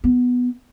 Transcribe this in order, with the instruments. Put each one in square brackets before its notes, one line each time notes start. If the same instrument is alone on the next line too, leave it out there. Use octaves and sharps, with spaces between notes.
[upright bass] B3